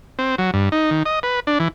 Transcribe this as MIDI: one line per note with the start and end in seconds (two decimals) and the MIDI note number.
0.19 0.35 60
0.38 0.51 54
0.54 0.69 43
0.72 0.90 63
0.91 1.03 51
1.06 1.19 75
1.23 1.40 71
1.47 1.58 62
1.60 1.68 52